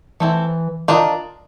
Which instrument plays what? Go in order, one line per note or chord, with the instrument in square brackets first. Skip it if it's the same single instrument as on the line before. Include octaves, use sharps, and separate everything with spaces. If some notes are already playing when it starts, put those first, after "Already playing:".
[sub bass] E3 [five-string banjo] A3 C4 E4
[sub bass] D#3 [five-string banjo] D4 F4 A#4 D#5